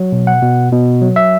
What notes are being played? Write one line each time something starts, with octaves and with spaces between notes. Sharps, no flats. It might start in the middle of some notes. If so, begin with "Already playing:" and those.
Already playing: F#3
B2
F#5
B2
B2
F#3
E5